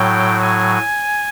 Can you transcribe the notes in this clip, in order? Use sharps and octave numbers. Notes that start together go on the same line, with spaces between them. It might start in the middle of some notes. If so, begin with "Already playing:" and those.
Already playing: A2 F#3 G5
G#5